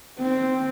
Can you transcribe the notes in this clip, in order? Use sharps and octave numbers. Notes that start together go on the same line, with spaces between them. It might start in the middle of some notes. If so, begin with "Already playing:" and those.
C4